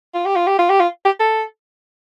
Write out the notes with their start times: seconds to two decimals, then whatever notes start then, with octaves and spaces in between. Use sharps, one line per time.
0.14 F4
0.25 G4
0.36 F4
0.47 G4
0.58 F4
0.69 G4
0.80 F4
1.05 G4
1.20 A4